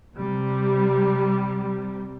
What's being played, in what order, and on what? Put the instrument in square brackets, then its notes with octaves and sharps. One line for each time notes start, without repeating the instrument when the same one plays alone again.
[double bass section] C3 G3